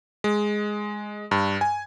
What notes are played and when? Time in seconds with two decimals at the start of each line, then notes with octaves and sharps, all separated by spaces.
0.24 G#3
1.31 G2
1.61 G#5